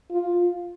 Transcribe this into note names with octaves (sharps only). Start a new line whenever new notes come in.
F4